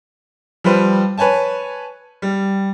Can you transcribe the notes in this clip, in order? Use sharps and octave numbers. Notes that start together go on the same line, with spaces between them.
F3 G3 B4 C5
B4 C#5 G#5 A5
G3